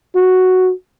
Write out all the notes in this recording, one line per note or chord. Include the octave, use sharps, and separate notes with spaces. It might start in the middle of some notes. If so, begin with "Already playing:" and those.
F#4